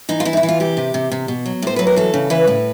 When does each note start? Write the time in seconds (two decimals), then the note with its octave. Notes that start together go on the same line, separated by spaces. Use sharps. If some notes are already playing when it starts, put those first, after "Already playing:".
0.09 E3 D#4
0.20 F4
0.25 E3 E4
0.33 D#4
0.37 E4
0.43 E3
0.49 F4
0.60 C3 G4
0.77 C3
0.94 C3
1.12 C3
1.28 B2
1.46 F#3
1.62 A2 C5
1.76 F#3 B4
1.87 A#4
1.96 E3 A4
2.14 C#3
2.30 E3 B4
2.47 A2